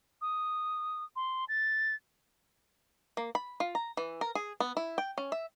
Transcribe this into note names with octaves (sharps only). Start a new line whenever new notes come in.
D#6
C6
A6
A#3
B5
F4
A#5
E3
A#4
G#4
B3
E4
G5
C#4
E5